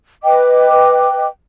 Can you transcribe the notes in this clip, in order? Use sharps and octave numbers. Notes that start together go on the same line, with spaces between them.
B4 D#5 G5 D6